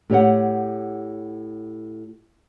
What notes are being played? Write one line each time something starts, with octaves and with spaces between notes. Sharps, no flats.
A2 G4 C#5 F#5